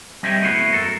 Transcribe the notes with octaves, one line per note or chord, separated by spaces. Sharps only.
G3 C4 D#5 E5 G5 G#5
A3 B3 E4 F#4 G#4
F#2 A4 A#4